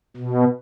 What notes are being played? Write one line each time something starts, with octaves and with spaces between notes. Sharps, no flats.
B2